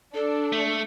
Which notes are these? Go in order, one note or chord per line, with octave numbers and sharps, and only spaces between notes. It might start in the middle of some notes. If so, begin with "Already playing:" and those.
D4 A4
A3